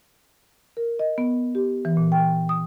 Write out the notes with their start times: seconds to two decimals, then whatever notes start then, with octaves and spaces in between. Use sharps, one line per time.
0.77 A#4
0.99 D#5
1.18 B3
1.55 G4
1.85 E3
1.97 A#2
2.12 G5
2.49 D#6